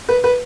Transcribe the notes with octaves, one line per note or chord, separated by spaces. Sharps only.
B4
B4